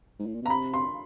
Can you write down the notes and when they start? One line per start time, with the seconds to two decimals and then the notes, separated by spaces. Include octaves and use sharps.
0.19 G#2
0.27 A2
0.34 A#2
0.42 B2
0.46 A#5
0.50 C3 B5
0.74 C6